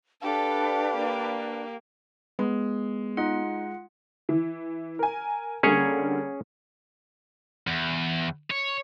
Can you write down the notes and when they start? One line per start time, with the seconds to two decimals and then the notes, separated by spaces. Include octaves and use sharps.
0.22 D4 G4 A4 B4 F5
0.94 A#3
2.39 G#3 B3
3.17 D#4 F4 F#5
4.29 E3
4.99 A#4 G#5
5.63 D3 G3 A#3 C#4 G#4 C#5
7.67 E2
8.51 C#5